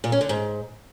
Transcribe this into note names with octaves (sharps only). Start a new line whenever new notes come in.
A#2
C#4
D3
G#2